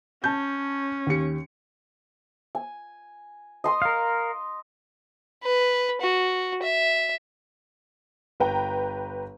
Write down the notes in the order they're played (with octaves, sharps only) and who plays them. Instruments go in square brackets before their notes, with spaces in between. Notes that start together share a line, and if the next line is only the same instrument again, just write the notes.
[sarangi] C#4 [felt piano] A5 G6
[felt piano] D#2 G4 C#7
[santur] G#5
D#5 C6 D#6
[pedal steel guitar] A#4 F5
[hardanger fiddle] B4
F#4
E5
[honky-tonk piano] G1 B4 G5 A#5